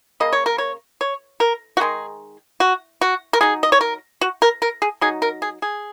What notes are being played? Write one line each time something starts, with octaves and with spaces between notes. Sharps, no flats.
C#3 A#3 D#5
C#5
A#4
C#5
C#5
A#4
F#4
D#3 G#3 D#4 G#4
F#4
F#4
A#4
F#3 D#4 G#4
D#5
C#5
A#4
F#4
A#4
A#4
G#4
F#3 D#4 G#4
A#4
G#4
G#4